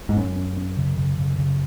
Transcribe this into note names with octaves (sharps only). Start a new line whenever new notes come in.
G#2
F#2 C#4
C#4
C#4
C#3
C#3
C#3
C#3